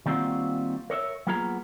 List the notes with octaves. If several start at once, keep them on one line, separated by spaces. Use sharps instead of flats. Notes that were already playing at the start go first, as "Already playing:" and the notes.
D#3 G3 A#3 C4 F4 F#4
A#4 C#5 D#5 E5
F#3 A#3 B3 F4 G#4 A#5